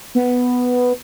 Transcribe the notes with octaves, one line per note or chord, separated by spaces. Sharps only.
B3